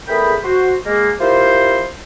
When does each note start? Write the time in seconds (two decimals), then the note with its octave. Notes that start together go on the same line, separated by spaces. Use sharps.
0.08 E2 A3 G#4 A#4 G5 B5
0.44 F#4 C5
0.86 G#3 A#3
1.21 E4 F4 G4 A#4 C5